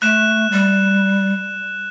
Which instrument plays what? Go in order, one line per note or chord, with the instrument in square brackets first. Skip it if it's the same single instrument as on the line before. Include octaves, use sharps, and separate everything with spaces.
[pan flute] A3 [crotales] F#6 E7
[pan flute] G3